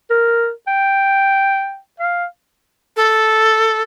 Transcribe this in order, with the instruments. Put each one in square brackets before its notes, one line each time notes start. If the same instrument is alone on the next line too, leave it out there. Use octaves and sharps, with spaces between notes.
[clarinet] A#4
G5
F5
[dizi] A4